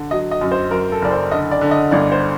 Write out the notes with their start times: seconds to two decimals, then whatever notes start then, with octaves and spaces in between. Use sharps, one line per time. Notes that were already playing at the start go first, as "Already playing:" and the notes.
Already playing: D3
0.11 F#3 D#5
0.31 D#5
0.41 F#2
0.51 C5
0.71 F#2 A#4
0.92 A4
1.02 F#1 D5
1.11 C5
1.31 D3 D#5
1.51 D5
1.61 D3
1.71 D#5
1.91 G1 D5
2.12 C5